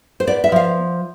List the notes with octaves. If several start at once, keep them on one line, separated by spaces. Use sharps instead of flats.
C5
B3 D5
E5
F3 F5